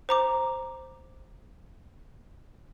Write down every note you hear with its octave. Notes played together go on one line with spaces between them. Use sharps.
C5 A#5 D6